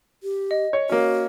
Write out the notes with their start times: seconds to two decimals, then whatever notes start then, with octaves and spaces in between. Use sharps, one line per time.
0.23 G4
0.51 D#5
0.73 C#5
0.89 A#3 C#4 F#4